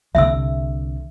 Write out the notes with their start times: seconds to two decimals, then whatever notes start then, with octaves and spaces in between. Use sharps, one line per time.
0.15 C2 D3 E5 E6